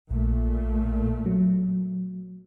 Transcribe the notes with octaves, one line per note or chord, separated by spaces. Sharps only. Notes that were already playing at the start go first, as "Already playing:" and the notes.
A#1 A#2 A3
F#3